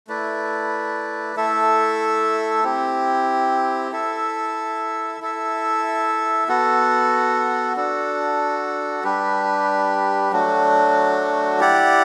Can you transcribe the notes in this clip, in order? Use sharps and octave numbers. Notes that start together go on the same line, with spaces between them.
A3 E4 B4 D5
A3 E4 A4 E5
C4 E4 G4
E4 A4 E5
E4 A4 E5
B3 F#4 A4
D4 F#4 A4
G3 D4 G4 B4
F#3 A3 D4 F#4
E4 G4 D5 F#5